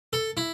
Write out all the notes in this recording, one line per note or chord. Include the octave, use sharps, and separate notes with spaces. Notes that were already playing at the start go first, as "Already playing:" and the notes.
A4
E4